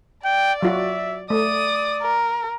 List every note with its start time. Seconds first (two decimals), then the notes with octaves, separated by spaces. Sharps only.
0.25 D5 G5
0.63 F#3 F4 F#4 E5
1.30 A3 D5 D#6
2.02 A#4